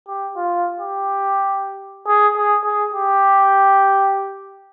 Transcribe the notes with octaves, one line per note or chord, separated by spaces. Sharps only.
G4
F4
G4
G#4
G#4
G#4
G4